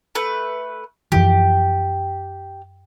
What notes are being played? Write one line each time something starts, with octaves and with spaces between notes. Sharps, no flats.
A3 B4
F#2 E3 F3 G4